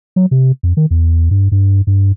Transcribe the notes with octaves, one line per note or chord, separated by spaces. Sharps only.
F#3
C3
F2
D#3
E2
G2
G2
G2